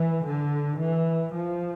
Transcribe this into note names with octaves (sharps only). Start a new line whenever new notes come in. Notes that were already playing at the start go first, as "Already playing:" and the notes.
Already playing: E3
D3
E3
F3